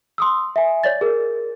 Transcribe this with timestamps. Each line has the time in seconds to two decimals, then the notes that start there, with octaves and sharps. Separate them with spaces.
0.18 C6 D#6 E6
0.56 E5 G#5
0.84 C#5 D5 A6
1.01 G#4 A#4